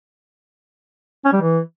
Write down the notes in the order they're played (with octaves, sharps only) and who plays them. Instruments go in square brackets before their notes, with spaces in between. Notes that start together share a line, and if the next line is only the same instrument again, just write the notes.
[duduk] C#4
G3
E3